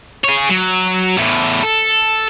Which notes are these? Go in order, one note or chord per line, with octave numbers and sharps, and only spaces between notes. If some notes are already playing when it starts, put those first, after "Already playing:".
G#4 C#5
F#3
E2 A2
A4